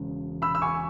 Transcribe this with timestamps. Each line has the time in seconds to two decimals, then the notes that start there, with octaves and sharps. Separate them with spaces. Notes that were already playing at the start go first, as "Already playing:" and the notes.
Already playing: E1 E2 C#3
0.42 B5 E6
0.55 E6
0.62 G#5 C#6